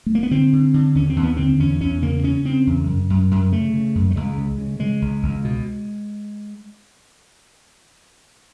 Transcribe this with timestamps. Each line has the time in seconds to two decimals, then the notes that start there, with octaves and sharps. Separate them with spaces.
0.06 A3
0.15 A#3
0.23 B3
0.31 D3 C4
0.53 D3
0.74 D3
0.95 D#2 C#4
1.09 C4
1.16 D#2
1.23 B3
1.37 D3 C4
1.60 E2 C#4
1.81 E2 C#4
2.02 C#3 A#3
2.23 C#3 C#4
2.45 C#3 C4
2.67 E2
2.87 F#2
3.10 F#2
3.31 F#2
3.52 C#3 A3
3.74 C#3
3.95 F#2
4.11 A3
4.16 C#2 G#3
4.38 C#3
4.58 C#3
4.80 C#3 G#3
5.02 C#2
5.23 C#2
5.45 B2